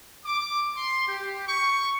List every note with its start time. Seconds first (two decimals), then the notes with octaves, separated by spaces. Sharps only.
0.24 D6
0.76 C6
1.07 G4
1.46 C#6